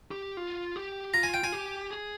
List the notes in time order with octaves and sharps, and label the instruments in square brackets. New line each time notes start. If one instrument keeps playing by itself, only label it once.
[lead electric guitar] G4
F4
G4
[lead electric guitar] F4 [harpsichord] A#5
[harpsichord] G#5
G5
[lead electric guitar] F4 [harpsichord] G#5
[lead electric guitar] G4
G#4